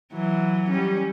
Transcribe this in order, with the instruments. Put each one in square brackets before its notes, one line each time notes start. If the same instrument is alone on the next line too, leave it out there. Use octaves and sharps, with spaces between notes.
[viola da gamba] E3 F#3
G3 C#4